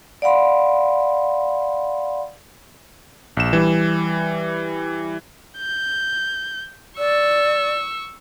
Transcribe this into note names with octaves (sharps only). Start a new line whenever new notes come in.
D5 F5 F#5 B5 C6
A#1 E7
E3 G3
G6
D5 C#6 E6